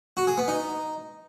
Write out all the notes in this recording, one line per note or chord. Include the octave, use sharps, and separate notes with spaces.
F#4
G#4
B3
D#4